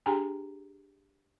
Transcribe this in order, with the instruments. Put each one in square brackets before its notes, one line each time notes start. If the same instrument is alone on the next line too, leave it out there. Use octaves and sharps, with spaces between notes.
[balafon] D4 G4 G#4 G5 G#5 A#5